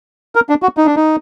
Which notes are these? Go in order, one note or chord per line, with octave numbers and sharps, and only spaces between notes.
A#4
D4
F#4
D#4
D4
D#4